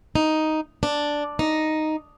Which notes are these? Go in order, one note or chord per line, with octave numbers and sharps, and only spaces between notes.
D#4
D4
D#4